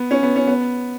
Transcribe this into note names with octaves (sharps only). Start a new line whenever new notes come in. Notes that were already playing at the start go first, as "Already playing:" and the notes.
Already playing: B3
C#4
B3
C#4
B3